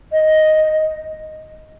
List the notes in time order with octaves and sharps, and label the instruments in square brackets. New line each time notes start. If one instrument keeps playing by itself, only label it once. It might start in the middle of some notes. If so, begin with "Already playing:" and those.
[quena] D#5